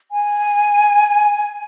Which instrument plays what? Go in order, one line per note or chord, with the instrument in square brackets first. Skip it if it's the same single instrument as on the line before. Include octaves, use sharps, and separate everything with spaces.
[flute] G#5